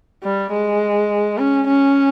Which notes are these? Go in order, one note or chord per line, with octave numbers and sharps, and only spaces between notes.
G3
G#3
C#4
C#4